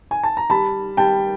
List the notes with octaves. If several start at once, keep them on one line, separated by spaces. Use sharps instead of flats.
G#5
A5
A#5
G3 A5 B5
G3 G5 A5